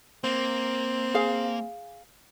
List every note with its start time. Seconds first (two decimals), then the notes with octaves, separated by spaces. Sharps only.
0.24 A#3 C4
1.14 G#4 F5